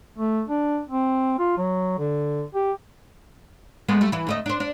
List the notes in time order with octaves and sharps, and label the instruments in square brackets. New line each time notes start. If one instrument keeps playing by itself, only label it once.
[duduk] A3
D4
C4
F4
F#3
D3
G4
[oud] G#3 A3 B3
G3 A3
E3 E4
D2 A3 D#5
D4 C5
D4